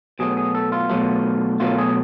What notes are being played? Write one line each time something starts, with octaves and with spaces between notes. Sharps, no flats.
B2 F#3 A3 G#4
G#4
A4
F4
B2 F#3 A3
B2 F#3 A3 F4
G#4